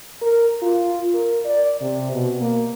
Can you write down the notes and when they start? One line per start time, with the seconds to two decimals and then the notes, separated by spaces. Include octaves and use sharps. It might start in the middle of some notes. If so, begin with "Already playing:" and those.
0.22 A#4
0.62 F4
1.14 A#4
1.46 D5
1.81 C3
2.11 B2
2.41 A#3